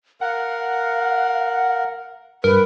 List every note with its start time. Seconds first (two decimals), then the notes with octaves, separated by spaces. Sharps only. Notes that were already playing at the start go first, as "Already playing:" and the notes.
0.21 A#4 F5 F#5
2.44 G2 A#4 B4